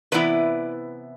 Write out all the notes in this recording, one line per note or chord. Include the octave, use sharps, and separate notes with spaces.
C3 E3 B3 E4 B4 D5